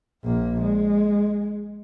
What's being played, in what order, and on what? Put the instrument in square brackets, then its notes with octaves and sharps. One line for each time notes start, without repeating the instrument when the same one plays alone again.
[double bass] A#1 A#3
G#3